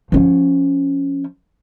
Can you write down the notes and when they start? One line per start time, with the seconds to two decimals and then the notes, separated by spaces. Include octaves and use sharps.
0.12 F3 C#4